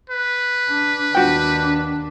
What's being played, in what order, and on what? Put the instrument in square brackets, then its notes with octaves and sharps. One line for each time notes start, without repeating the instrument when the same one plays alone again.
[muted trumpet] B4
[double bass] D4
[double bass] D#2 D4 [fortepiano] F#4 G5